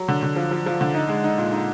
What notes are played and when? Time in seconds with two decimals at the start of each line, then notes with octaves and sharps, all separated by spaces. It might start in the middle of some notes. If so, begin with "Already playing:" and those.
Already playing: F#3
0.08 D3
0.23 D3
0.36 F3
0.51 F3
0.66 F3
0.81 D3
0.94 D#4
1.09 G#3
1.24 D#4
1.38 A#2
1.52 D#4